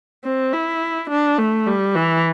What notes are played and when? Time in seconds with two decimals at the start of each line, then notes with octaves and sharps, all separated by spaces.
0.24 C4
0.53 E4
1.10 D4
1.39 A3
1.67 G3
1.96 E3